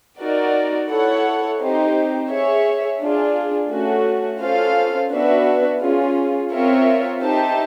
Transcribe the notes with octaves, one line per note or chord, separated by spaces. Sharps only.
D#4 F#4 A#4 D5
E4 A4 C#5 F#5
C4 D#4 G4 C5
G#4 C#5 E5
D4 F4 G#4
A3 C#4 F#4
C#4 F4 A4 C5 F5
B3 D4 F#4 B4 E5
C#4 F4 G#4
C4 F4 A#4 C#5 E5
D#4 G4 C5 E5 A5